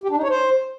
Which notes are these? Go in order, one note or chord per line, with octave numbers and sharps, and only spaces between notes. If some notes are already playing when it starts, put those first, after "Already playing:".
G4
D4
D#4
C#5
C5